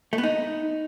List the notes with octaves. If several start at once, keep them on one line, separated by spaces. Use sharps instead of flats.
A3
B3
D#4